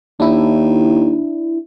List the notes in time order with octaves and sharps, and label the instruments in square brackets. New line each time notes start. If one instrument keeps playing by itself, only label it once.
[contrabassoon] D#2 [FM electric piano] D4 E4